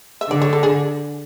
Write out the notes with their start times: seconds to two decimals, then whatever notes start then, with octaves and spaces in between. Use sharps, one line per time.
0.21 E5
0.30 D3 D5
0.42 C#5
0.53 A4
0.63 G#4